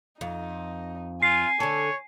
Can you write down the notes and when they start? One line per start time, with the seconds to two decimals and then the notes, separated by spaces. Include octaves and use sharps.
0.21 F2 D#4
1.22 F4 G#5 C7
1.60 D3 A4 C#5